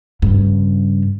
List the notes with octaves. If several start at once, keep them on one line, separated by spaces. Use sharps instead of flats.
G2 C#3